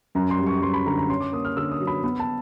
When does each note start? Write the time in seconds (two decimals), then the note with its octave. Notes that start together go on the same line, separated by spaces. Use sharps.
0.15 F#2 A#5
0.31 C6
0.38 G3
0.46 C#6
0.62 F#2 C6
0.74 B5
0.86 D3 A#5
0.98 A#5
1.09 C#4 C6
1.20 D6
1.32 A#3 D#6
1.45 F6
1.57 D3 E6
1.72 D#6
1.80 F#3
1.87 B5
2.04 B3 B5
2.20 A5